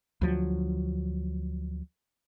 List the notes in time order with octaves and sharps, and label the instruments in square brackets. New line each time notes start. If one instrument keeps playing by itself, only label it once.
[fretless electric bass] D2 F3 F#3